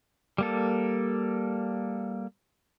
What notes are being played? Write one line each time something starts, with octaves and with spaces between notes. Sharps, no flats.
G3 A#3 A4